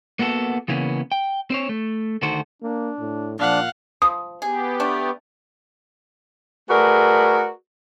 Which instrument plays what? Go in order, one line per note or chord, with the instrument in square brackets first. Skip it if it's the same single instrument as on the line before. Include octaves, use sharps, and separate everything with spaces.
[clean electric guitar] A#3 B3 F#4 A4
C#3 E3 A#3 B3 C#4
G5
C4 C5 C#5
A3
D2 D#3 F#4 A4 C5
[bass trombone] A#3 [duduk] D4
[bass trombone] A2
[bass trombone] A#2 [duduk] F3 [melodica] D4 [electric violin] F5 F#5
[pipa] F3 [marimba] D#6
[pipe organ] B3 G4 [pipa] G#4
[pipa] A3 D4
[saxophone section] A3 F#4 G#4 A#4 B4 D5